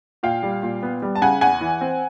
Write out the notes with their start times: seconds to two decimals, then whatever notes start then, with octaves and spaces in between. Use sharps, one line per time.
0.23 A#2 F5 G5
0.43 G3
0.63 A#2
0.83 B3
1.02 G3
1.15 A5
1.21 C#3 F#5 G#5
1.41 E2 F#5 G#5
1.61 E3
1.81 C4